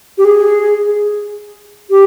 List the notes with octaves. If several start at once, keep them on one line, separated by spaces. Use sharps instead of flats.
G4
G#4
G4